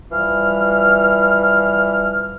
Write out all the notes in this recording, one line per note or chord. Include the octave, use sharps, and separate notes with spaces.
E3 F3 G3 F6